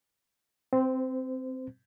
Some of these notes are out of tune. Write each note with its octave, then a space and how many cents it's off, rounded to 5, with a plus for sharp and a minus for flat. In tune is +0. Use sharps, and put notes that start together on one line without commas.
C4 -5 C5 -30